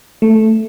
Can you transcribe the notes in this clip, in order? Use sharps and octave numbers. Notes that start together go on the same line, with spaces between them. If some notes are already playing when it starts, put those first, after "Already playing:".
A3